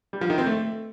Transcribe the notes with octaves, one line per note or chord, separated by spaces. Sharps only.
G3
F3
D#3
C4
A3